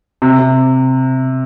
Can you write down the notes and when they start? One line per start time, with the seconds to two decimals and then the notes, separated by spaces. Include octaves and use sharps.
0.22 C3
0.39 C3